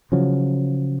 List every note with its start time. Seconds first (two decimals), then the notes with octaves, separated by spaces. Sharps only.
0.12 C#3 F3 F#3